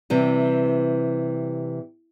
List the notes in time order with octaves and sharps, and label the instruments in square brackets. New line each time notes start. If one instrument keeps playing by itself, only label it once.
[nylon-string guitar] C3 E3 G3